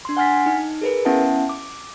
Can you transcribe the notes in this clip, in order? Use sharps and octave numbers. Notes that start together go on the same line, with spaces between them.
D4 C6
F#5 G#5 F6 A6 B6
D#4
G#4 A#4 B4
B3 C#4 E4 E5 F#5 A5
D6